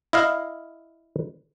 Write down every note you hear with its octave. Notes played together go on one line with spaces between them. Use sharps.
E4 D#5 F5